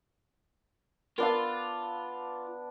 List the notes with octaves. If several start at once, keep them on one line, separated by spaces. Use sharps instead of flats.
B3 D4 F4 A#4 F5 E6